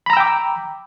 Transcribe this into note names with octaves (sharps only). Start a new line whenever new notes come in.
G5 A#5 B5 D6 E6